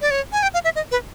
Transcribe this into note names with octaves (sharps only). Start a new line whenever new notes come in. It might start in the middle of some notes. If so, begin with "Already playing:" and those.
D5
C#5
G#5
G5
F5
E5
D#5
B4